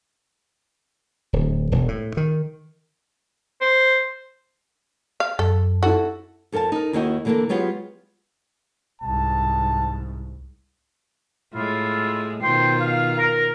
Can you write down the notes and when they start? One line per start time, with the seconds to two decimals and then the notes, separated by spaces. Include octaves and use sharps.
1.33 D1
1.72 E1
1.88 A2
2.17 D#3
3.61 C5
5.20 F5
5.39 F#2 A4
5.83 E4 F#4 A4
6.52 F2 A4 A#4 F5 A5
6.72 D#4 A#4
6.93 D#2 A#3 E4 F#4 D#5 G5
7.25 D3 E3 A#3 B3 A4 A#4
7.49 F#3 G#3 B3 F4 G4
9.02 C2 G#2 A5
11.54 A2 G#3 E4 F4
12.42 B2 D#3 F4 C5 G5 C6
12.81 F5
13.17 A#4